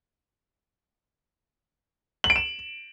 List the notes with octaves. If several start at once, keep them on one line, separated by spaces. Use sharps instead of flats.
F#7
D7
E7